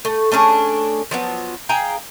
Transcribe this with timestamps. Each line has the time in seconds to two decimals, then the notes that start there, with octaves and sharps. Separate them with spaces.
0.05 A3
0.32 A3 C#4 D4 G#4
1.11 F3 F#3 B3
1.69 G#4 F5 G5 A#5